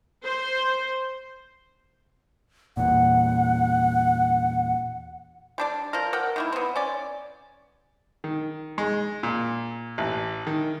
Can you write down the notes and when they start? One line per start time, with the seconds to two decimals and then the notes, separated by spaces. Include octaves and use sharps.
0.24 C5
2.77 E2 A#2 F#5
5.58 G3 D4 D5
5.93 F3 A#4
6.13 A#4 D5 F#5 G5
6.36 D#3 A#3 E4
6.52 B3 C4
6.76 C#4 D5
8.24 D#3
8.78 G#3
9.23 A#2
9.98 A1
10.47 D#3